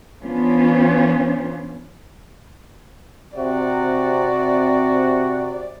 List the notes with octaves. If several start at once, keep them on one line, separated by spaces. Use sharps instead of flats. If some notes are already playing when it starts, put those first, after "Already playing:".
E3 B3 C#4 D4 F4 C5
C3 C4 F#4 D5